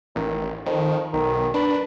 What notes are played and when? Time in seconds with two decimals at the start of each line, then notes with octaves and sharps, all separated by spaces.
0.16 A1 D#3
0.66 F2 D#3
1.13 B1 D#3
1.54 D4 B4